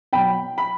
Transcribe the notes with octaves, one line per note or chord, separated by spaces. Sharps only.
B2 F#3 G5 B5
B5